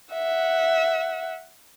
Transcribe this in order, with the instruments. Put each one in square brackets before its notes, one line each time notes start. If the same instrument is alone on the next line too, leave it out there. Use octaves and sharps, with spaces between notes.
[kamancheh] E5 F#5